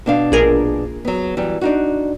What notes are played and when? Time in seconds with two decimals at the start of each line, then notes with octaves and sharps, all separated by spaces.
0.06 B2 D4 F5
0.32 A#1 G#4 A#4
1.05 F#3 B3
1.37 E3 F#3 G3
1.61 D4 D#4 F#4